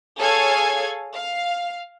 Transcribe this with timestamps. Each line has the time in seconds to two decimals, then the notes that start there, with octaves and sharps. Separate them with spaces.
0.19 G#4 A4 C#5 F5 G#5 G#6
1.17 F5